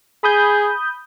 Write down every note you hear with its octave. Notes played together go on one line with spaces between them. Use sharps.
G#4 B5 D#6 G6